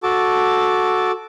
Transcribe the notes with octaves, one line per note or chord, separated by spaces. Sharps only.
F#4 A4 A5 D6